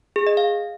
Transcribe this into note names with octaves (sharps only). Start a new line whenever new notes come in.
G#4
D#5
F5